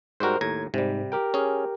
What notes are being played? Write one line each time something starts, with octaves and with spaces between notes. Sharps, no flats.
G#2 G3 F#4 A#4 C5
D#2 A2 A#5 G#6
G#2 C3 G3
G4 A#4 G5
C#4 G#4